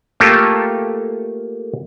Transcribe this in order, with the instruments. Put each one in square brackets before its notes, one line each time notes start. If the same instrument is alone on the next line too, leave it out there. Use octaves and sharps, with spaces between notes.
[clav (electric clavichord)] A3 A#3 F4 G4 A4